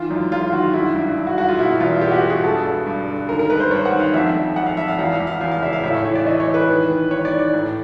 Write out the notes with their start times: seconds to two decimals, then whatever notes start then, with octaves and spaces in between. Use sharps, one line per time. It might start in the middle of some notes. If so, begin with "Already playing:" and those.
Already playing: D#3 E3 F4
0.10 F#2
0.32 F#2 F4
0.42 F4
0.53 D#3 F#4
0.63 F4
0.74 G2 E4
0.95 G2
1.17 G2
1.27 F#4
1.38 G2 F#4
1.48 F4
1.59 B2 E4
1.80 E2 F4
2.01 B2 G4
2.11 F#4
2.16 G4
2.23 B2
2.30 G#4
2.44 G2 A4
2.65 G2
2.86 G2
3.07 D3
3.29 D#3 A#4
3.39 A#4
3.50 G2 B4
3.60 C5
3.71 G2 C#5
3.85 F#5
3.93 D#3
4.00 F5
4.14 F2 E5
4.35 F2
4.56 F2 F#5
4.66 F5
4.77 F2 E5
4.88 F5
4.99 E2 F#5
5.13 F5
5.20 E2
5.27 F5
5.41 E2 F5
5.52 F5
5.62 C#3 E5
5.73 F5
5.83 A2 E5
5.94 C#5
6.04 E3 C#5
6.16 D5
6.26 E3 D#5
6.40 C#5
6.47 E3
6.54 B4
6.68 D#3
6.90 D#3
7.11 D#3 C#5
7.25 D5
7.32 D#3
7.39 D5
7.53 A2